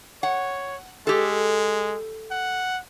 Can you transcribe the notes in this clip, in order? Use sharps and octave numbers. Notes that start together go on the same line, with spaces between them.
C#5 F#5
G#3 G4 A4
F#5